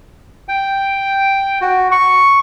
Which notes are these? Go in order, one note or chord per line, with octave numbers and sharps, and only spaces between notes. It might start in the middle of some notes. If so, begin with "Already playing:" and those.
G5
F#4
C#6